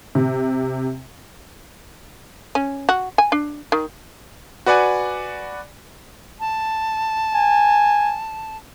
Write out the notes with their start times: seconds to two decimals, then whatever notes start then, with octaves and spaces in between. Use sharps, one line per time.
0.15 C3
2.55 C#4
2.89 F#4
3.18 G#5
3.32 D4
3.72 D#3
4.66 F#4 B4 D5 F#5 G#5
6.40 A5
7.34 G#5